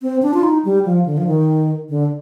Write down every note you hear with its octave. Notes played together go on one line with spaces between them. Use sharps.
C4
D4
F4
D#4
G3
F3
D3
F3
D#3
D3